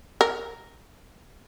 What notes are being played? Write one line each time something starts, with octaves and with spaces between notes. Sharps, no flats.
A#4